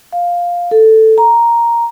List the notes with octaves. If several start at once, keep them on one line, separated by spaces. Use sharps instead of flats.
F5
A4
A#5